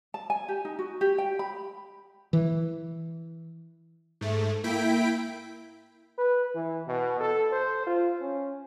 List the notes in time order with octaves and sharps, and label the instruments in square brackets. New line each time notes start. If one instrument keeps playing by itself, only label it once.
[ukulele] A5
G#5
G4
D#4
F#4
G4
G5
B5
[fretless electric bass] E3
[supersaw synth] G#2 A3
A#3 E4 G5 B6 D7
[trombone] B4
E3
B2
A4
C5
F4
C#4